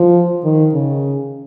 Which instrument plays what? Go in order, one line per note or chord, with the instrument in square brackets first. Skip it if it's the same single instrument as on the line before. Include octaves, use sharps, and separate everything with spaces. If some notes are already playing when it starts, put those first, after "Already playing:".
Already playing: [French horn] F3
D#3
C#3